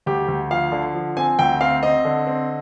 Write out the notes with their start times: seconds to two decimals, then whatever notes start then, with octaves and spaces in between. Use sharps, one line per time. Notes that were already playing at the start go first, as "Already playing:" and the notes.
0.06 D2 G4
0.28 D2
0.51 F3 F5
0.72 D3
0.94 F3
1.16 C4 G#5
1.39 D2 G5
1.61 C4 F5
1.83 C4 D#5
2.05 D3
2.27 C4